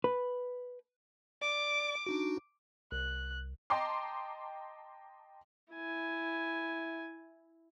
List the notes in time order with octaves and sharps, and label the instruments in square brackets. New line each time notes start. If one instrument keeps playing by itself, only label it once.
[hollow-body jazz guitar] B4
[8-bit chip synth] D5 [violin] D6
[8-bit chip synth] D4 D#4 F#4
[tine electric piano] C2 [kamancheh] F#6
[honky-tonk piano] D#5 G5 A5 A#5 C6 D6
[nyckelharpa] E4 G#5